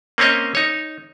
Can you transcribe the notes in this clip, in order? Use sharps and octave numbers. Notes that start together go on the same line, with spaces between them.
A#3 C4 C#4 C#5 D#5
D#4 C#5